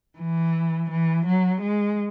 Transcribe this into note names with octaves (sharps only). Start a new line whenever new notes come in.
E3
E3
F#3
G#3